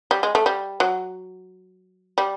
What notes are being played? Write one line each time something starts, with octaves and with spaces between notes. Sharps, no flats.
G3
G#3
A3
G3
F#3
G3